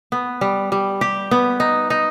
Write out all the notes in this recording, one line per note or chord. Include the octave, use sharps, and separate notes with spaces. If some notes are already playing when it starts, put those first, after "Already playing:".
B3
G3
G3
G4
B3
D#4
D#4